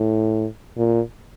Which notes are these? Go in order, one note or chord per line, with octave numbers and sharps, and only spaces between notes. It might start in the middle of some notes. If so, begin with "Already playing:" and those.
Already playing: A2
A#2